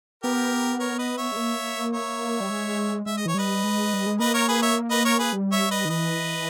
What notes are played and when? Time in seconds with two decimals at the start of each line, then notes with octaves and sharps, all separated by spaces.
0.23 B3 G4 A#4
0.80 A#4 C#5
0.99 B4 D#5
1.17 C#5 E5
1.32 G#3
1.37 A#3
1.93 C#5 E5
2.40 G3
2.50 G#3
3.06 G#3 E5
3.17 D#5
3.26 E3 C#5
3.34 G3 B4 D#5
3.64 G#3
3.94 G3
4.06 G#3
4.20 A#3 B4 D#5
4.34 A#4 C#5
4.48 G#4 B4
4.62 C#5 E5
4.91 B4 D#5
5.05 A#4 C#5
5.19 G#4 B4
5.33 G3
5.52 C#5 E5
5.71 B4 D#5
5.85 D#3
5.90 E3 B4 D#5